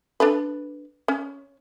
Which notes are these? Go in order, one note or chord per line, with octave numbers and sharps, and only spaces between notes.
D4 A4 B4
C#4